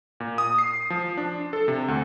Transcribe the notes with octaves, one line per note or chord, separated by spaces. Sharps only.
A#2
D#6
C7
F3
D4
A4
C3
D2